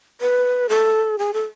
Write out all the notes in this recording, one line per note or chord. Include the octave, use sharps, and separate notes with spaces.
B4
A4
G#4
A4